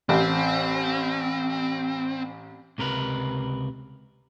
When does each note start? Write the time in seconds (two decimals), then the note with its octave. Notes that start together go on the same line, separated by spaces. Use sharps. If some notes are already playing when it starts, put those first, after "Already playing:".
0.09 A1 C4
2.78 C#2 C3 A#4 B4